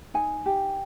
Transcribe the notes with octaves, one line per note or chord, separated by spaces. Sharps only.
D#4 G#5
G4